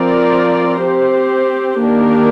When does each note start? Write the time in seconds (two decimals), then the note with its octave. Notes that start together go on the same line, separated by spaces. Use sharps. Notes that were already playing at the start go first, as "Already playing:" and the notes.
Already playing: F3 C4 F4 A#4 D5
0.81 C4 G4 C5
1.81 D#3 A#3 D4 G4 A#4